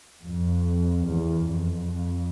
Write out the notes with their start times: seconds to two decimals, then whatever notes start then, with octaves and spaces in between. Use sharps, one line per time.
0.24 F2
1.09 E2
1.52 F2